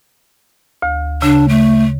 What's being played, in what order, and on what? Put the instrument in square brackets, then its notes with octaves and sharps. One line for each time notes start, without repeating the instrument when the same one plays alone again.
[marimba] D2
[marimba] C#3 [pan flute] D4
[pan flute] A3